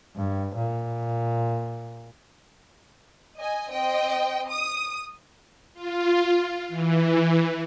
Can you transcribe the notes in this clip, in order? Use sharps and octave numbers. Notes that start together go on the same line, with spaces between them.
G2
A#2
D#5 G#5
C4 D#5 G5
D#6
F4
E3